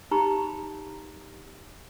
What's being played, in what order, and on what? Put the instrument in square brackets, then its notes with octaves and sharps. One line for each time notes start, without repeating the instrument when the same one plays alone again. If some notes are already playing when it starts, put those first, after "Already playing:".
[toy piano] D#4 G4 A#5 B5 C#6